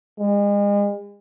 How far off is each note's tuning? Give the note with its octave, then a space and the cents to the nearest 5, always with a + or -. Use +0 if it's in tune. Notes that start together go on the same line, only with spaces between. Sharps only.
G#3 -35